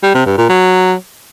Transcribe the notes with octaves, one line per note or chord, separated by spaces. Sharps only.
G3
C3
G2
A#2
F#3